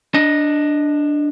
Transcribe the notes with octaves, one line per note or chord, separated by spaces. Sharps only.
D4 D#5